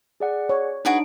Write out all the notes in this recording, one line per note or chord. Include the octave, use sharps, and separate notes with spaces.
G#4 D5 F#5
C#5
D4 D#4 F#4 G#4 B4 D7